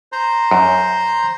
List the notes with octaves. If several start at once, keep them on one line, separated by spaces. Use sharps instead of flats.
C5 A#5 C6
F#2